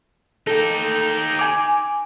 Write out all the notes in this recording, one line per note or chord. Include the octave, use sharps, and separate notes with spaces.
D#4 G4 A4
G#5 D6